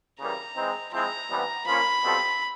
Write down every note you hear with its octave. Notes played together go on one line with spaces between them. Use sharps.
C#3 E3 G3 A#3 A#5
E3 G#3 C4 D#4
F3 G#3 C4 E4 A#5
C3 E3 G3 B3
F3 A#3 C#4 F4 B5
B2 G3 C4 F4 A4